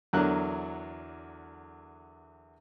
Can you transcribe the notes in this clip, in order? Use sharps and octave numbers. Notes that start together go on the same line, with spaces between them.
E2 D3 F#3 D4 A#4 F#6